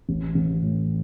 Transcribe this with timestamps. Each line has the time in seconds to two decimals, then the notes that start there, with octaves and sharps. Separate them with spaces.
0.09 A1
0.35 A1
0.62 A2